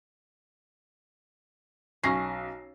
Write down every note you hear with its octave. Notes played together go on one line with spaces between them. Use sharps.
B1 C#4 A#6 C7